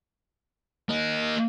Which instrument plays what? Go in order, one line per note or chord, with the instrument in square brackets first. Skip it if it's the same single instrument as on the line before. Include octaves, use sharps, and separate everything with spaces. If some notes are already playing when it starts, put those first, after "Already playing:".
[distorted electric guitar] A#3 D#5